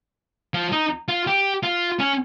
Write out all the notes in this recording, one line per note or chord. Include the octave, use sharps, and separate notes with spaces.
F3
D#4
F4
G4
F4
C#4